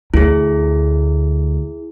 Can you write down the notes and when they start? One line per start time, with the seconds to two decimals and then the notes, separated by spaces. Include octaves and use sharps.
0.14 D2 E4 G#4